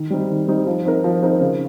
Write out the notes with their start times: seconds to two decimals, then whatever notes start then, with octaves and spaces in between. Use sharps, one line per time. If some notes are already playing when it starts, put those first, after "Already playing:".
Already playing: D#3
0.10 G3 C4 D#4
0.29 D#3
0.48 G3 C4 D#4
0.67 F3
0.85 C4 D#4 A#4
1.04 F3
1.22 C4 D#4 A#4
1.41 C#3